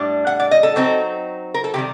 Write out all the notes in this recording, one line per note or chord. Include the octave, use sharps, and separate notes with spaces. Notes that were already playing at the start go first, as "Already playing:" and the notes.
Already playing: A2 G3 D4
F#5
D5
D#5
A4
F#3 C4 D#4
A#4
A4
C3 D#3 G3 G4